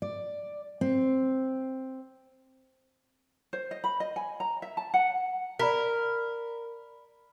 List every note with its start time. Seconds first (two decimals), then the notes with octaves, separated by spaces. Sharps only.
0.02 D5
0.81 C4
3.53 C5
3.71 D#5
3.84 B5
4.00 D#5
4.16 G#5
4.40 A#5
4.62 E5
4.77 A5
4.94 F#5
5.59 A#4 D5 B5 B6